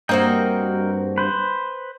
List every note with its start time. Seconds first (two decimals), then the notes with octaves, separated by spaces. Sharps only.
0.09 G2 A#3 C4 F#4 A#4 D#5 G5
1.18 B4 C5